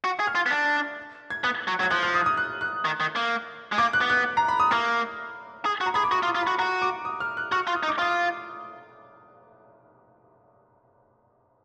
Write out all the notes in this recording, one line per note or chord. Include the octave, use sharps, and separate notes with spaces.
F#4
G#4
F6
F4
B3
D4
G#6
B3 F#6
F#3
F#3
G#6
F3 F#6
F6
D#6
D#6
F#6
F#6
D#3
D#3
A#3
G#3
A#3 D6
F#6
B3
F#6
A#5
B5
D#6
A#3 F6
G#4
F#4
A#5
G#4 B5
D6
F#4 D#6
F4
D#6
F4
F#4 B5
F#4 A#5
D6
D#6
F6
F#6
F#4 F6
F4
D#6
D#4
D6
F4 D#6